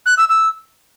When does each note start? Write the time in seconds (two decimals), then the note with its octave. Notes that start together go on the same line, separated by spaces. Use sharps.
0.06 F#6
0.17 E6
0.29 E6